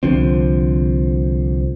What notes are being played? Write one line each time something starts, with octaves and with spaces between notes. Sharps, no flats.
C2 D3 F3 C4